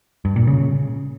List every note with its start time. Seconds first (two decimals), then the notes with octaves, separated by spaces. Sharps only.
0.25 G2
0.36 A#2
0.47 C#3